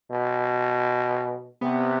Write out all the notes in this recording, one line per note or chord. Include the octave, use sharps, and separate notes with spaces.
B2
C3 B3